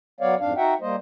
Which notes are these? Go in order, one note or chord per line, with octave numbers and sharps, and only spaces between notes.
F#3 B3 C#5 D5 F5
F2 G#2 D4 F5
D#4 F#4 E5 F#5 G5
G3 A#3 C5 D#5